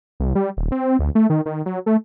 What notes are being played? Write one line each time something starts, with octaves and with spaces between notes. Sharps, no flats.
C2
G3
D#1
C4
D2
A3
D#3
D#3
F#3
A3